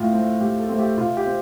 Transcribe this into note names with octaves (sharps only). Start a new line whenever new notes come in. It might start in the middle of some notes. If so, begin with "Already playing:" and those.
Already playing: A2 F4
A3 C4
A2 G4
A4
A3 C4
G4
C3 F4
G4
C4